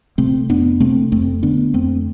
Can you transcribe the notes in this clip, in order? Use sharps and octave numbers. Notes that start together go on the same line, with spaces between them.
C3 A3 C4
F2 B3 D4
C3 A3 C4
F2 A3 C4
D3 B3 D4
F2 A3 C4